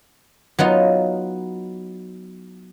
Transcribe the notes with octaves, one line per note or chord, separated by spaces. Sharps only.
F#3 B3 D#4 F4